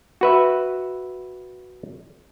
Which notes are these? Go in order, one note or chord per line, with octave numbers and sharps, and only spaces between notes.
F#4 B4 E5